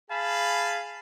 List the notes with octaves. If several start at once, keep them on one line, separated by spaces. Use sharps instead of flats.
G#4 F5 G#5 A5 B5